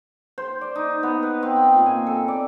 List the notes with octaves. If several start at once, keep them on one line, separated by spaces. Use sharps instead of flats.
C5
D5
D#4
B3
B4
C4
G5
A#2
G#5
A4
D5